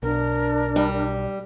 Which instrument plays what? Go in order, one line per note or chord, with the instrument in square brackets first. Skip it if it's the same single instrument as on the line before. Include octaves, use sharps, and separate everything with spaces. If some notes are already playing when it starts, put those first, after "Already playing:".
[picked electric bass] B1 [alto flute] D4 [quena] A#4
[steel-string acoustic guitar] G3